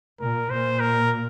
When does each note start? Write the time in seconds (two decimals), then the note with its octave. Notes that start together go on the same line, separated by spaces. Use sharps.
0.20 A#2 A#4
0.50 A#2 C5
0.80 A#4